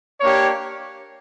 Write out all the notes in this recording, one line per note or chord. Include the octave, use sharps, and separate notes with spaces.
A#3 D4 G4 C#5